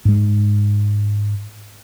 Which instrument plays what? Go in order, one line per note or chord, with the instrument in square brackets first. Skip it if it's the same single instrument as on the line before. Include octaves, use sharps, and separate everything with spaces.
[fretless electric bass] G#2 G#3